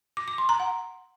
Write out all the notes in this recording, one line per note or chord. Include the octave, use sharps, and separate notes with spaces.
D6
D6
C6
A#5
F#5